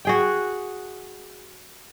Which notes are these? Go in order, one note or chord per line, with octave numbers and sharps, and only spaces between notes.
F#4 G#4 G5